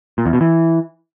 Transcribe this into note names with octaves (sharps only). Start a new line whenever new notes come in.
A#2
E2
B2
E3